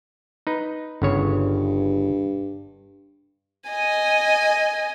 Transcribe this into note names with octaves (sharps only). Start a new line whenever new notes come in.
D#4 B4
G1 G2 C#3 C#5
D#5 G#5